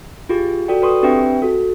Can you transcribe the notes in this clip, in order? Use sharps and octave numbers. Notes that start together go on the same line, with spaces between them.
F4 G4 G#4
F#4 A4 D5 G5
A4 B4 G5 C6 C#6 D#6
C4 D4 G4 B4 E5 G5
F#4 A4